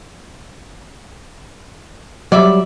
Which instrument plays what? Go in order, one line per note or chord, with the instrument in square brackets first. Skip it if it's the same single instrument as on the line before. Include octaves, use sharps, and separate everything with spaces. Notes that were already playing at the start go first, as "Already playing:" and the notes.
[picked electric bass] F#3 G3 [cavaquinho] D5 E5 D6